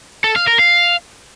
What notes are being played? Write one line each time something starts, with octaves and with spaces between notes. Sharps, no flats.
A4
F5
A#4
F5